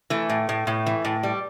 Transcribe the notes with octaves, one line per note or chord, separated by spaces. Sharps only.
E3 A3
A2
A2
A2
E3
A2
G3